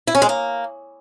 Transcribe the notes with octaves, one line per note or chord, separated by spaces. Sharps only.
E4
C#4
G#3
A#3